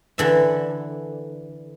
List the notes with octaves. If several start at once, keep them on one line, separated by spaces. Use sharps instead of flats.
D3 E3 E5